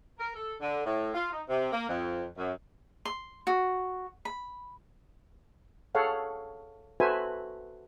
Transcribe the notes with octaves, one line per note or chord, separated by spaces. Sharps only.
A#4
A4
D3
A2
F4
D#4
C3
A#3
F2
F#2
C6
F#4
B5
G#4 A4 C#5 F5 F#5
F#4 A4 B4 C5 E5 G#5